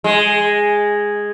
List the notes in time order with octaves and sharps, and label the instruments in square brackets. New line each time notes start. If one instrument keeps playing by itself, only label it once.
[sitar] G#3